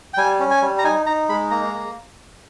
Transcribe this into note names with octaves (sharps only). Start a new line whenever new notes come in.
G5
G3 G#5
C#4
G#5
G3
A#5
D#4 G#5
D#4 A#5
G#3 B5
A#3 A#5
A#3